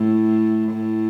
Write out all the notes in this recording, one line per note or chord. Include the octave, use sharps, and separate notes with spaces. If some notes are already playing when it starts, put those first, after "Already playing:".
Already playing: A2
A2